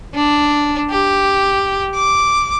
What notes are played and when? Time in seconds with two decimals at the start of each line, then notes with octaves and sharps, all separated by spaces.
0.14 D4
0.90 G4
1.95 D6